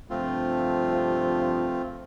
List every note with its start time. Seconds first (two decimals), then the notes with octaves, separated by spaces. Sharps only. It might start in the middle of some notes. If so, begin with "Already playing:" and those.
0.10 G2 C3 F3 A3 C4 F4